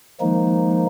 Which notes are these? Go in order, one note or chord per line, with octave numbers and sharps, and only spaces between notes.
D#3 F3 G#3 A#3 D#4